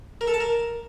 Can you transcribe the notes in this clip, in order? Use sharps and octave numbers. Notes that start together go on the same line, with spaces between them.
A#4
A4
A5
A#4